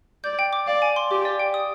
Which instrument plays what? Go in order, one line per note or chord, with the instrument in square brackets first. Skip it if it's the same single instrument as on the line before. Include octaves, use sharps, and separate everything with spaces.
[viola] D5 [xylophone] G6
[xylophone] G5
D6
[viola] D5 [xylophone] F5
[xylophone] G#5
C6
[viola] G4 [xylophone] D6
[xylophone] D5
G5
D#6